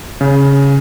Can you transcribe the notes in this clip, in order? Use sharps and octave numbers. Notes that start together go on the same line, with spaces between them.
C#3